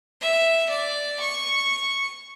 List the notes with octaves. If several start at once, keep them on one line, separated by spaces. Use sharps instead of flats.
E5
D5
C#6